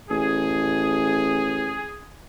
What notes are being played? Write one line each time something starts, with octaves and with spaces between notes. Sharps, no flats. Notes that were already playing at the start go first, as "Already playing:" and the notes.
A1 G#4